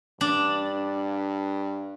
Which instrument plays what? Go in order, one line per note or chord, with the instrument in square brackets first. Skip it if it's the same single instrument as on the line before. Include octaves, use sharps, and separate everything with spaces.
[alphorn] G2 [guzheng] D4